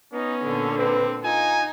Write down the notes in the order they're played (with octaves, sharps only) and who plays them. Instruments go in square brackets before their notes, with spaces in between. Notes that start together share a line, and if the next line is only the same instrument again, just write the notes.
[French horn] B3 [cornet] C#4 [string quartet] D#4
[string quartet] A#2 D3
[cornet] C4 [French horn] B4
[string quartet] D#4 [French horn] F4 [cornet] G#5